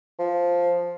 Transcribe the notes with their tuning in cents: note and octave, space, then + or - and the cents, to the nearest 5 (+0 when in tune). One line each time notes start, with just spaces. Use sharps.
F3 +0